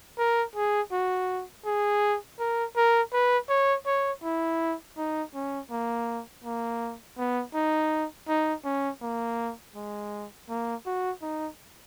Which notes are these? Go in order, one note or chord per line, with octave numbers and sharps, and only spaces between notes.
A#4
G#4
F#4
G#4
A#4
A#4
B4
C#5
C#5
E4
D#4
C#4
A#3
A#3
B3
D#4
D#4
C#4
A#3
G#3
A#3
F#4
D#4